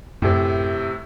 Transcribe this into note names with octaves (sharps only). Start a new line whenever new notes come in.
F#2 A2 C3